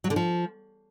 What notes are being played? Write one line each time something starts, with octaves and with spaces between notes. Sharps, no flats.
F#3
D3
F3